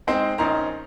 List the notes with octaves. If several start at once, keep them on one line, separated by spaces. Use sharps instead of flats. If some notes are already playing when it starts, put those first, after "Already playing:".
G#3 C4 D#4 C5
A#1 C#4 D#4 A#4 C5 A#5